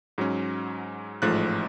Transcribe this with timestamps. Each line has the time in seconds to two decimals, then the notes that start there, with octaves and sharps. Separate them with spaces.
0.18 G#2 F#3 C#4
1.22 A1 G#2 F3 A3 F#6